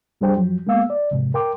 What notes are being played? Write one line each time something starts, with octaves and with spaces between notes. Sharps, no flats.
F#2 G3 D4 G#4 C5 G5
F#2 F3 F#3
G#3 A#3 B3 F5 E6
D5
F2 G#2 C3
A#4 G5 C6 D6